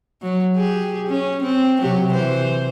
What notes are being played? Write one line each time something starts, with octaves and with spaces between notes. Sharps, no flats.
F#3
G4 G#4
C#4
C4
C3 F#3 G4
E3 C5